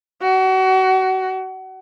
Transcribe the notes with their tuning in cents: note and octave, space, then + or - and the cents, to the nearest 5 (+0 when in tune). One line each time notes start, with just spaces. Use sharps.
F#4 +30